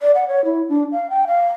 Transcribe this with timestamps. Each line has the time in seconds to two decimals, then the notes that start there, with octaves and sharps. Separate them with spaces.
0.01 D5
0.15 F#5
0.28 C#5
0.45 E4
0.69 D4
0.92 F5
1.10 G5
1.27 F5